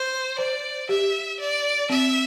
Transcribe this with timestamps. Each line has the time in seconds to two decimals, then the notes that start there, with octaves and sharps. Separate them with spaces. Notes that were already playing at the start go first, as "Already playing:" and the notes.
Already playing: C5
0.38 C5 D5
0.89 G4 E5
1.40 D5
1.90 C4 E5